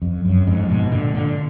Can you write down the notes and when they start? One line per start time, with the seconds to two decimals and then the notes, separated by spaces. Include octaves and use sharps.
0.02 F2
0.25 F#2
0.47 F2 G#2
0.69 G#2 B2
0.92 A#2 D3
1.14 A#2 D3